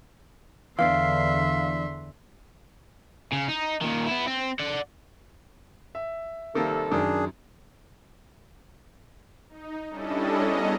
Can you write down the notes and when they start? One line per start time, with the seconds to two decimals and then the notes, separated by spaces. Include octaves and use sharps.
0.79 E2 D3 E3 B3 D4 E5 F5 C6
3.33 C#3
3.49 D#4
3.82 A#2 D#3
4.07 B3 E4
4.27 C4
4.59 D5 F#5
5.95 E5
6.55 C3 D#3 G3 A#3 A4
6.91 F#2 D#3 D4 G#4
9.49 D#4
9.90 G3 C#4 D4 E4 A4 D#5
10.43 B3 C#4 G#4 D#5 A5 A#5